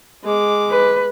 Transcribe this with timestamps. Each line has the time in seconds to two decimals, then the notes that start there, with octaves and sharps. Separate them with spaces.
0.24 G#3 D6
0.70 B4